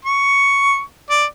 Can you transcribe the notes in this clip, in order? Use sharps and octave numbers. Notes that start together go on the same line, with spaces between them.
C#6
D5